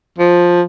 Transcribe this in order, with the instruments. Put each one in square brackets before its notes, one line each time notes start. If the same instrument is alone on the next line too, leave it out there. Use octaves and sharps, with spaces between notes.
[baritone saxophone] F3